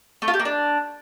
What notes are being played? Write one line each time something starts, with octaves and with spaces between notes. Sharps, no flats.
A3
F4
G4
A#3
D4